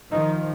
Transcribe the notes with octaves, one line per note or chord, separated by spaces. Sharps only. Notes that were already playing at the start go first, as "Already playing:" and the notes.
D#3 F3 D#4